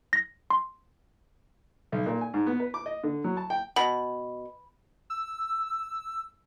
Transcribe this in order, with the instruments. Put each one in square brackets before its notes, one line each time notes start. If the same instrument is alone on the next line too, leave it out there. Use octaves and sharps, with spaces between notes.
[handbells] A#6
C6
[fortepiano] B1
A#2
G#5
G#2
B3
B4
D6
D#5
D3
F#3
A5
G5
[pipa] B2 [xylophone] B5
[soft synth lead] E6